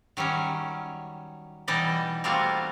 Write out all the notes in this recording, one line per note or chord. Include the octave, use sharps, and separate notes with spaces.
D#3 F#3 G3 C#4
B2 E3 G3 D#4 D5 D#5
G3 A3 A#3 C4 F4 F#4